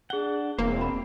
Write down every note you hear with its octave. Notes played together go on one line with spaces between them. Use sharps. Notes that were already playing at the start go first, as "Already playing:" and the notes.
D4 G#4 F#5 G7
E1 A#3 C4 C5
B5